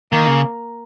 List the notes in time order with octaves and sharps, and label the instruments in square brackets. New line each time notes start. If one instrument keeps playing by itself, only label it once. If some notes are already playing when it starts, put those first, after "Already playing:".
[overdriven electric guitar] D#3 [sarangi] A#3
[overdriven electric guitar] C#3